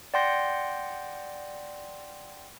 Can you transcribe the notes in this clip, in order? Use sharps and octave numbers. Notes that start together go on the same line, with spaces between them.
D5 F#5 G5 C6 G6 A#6